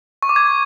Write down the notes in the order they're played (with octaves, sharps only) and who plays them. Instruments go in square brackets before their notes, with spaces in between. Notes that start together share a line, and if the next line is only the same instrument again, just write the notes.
[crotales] C#6
D6
G#6